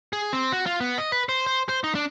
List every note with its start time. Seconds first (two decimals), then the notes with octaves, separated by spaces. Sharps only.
0.13 G#4
0.33 C4
0.52 F#4
0.66 F4
0.81 B3
0.98 D#5
1.12 B4
1.29 C5
1.47 C5
1.69 C5
1.84 D#4
1.95 D4